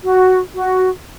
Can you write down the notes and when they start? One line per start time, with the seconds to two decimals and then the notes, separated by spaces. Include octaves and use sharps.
0.04 F#4
0.54 F#4